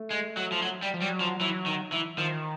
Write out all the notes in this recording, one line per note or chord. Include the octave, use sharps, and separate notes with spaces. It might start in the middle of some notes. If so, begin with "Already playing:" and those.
Already playing: A3
G#3
F#3
F3
F#3
G3
F3
F#3 G3
F3
E3 F#3
D#3
E3
D#3 F3